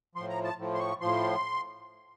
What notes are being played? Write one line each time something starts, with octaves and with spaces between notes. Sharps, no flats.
A2 F3 C6
A#5
A5
A2 F3
C6
C#6
A2 F3 C6